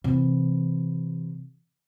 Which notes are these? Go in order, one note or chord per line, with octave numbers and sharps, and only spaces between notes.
C3 E3